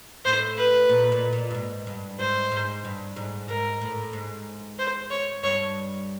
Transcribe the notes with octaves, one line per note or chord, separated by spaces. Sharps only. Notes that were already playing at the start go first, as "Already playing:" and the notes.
A2 C5
B4
A#2
A#2
A#2
G2
G#2
G2
G#2 C5
G#2
G2
G#2
G#2 A#4
A2
G#2
C5
C#5
G2 C#5